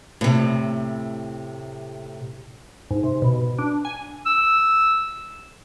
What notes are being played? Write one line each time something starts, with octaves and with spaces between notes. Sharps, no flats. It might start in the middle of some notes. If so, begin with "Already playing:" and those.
A2 C3
G#2
C3
B2
D4
G#5
E6